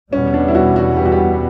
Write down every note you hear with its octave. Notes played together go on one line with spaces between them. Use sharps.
E2 B2 G3 B3 C#4
D4
E4
F#4
F#4
G4
F#4
G4